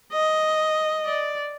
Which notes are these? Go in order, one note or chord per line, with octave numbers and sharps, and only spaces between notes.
D#5
D5